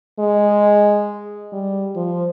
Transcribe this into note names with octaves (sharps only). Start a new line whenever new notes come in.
G#3
G3
F3